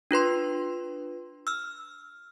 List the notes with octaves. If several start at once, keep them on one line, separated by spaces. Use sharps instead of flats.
D4 F4 B4 C6
E6 F6